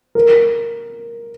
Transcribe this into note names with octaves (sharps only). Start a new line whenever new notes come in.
A#4